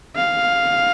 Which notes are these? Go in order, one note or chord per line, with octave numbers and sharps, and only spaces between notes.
F5